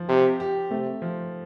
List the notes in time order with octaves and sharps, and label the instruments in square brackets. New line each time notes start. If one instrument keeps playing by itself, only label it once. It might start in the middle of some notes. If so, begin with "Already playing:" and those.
Already playing: [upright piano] F3
[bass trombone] C3 [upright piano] G4
[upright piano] G4
[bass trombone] C3 [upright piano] A3
[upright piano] F3